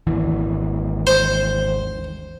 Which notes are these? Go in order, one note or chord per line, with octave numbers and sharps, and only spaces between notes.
G#1 D#2 E3
C5